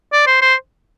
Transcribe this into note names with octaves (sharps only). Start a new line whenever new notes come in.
D5
C5
C5